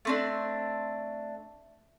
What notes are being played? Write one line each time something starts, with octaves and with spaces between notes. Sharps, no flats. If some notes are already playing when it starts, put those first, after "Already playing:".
A3 C4 D4